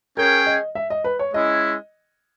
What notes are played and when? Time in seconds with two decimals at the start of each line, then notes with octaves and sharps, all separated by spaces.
0.17 C#4 G#4 A#4 C#5 G5
0.47 D#5
0.75 E5
0.90 D#5
1.04 B4
1.19 C#5
1.34 G#3 C#4 E4 D#5